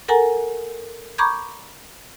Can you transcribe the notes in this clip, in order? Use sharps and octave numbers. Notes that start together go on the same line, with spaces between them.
A4 A#4 F#5 G#5 A#5
A#5 B5 C#6 D6 G6 G#6